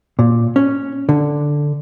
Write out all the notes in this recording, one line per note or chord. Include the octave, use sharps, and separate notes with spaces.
A#2
C#4
D3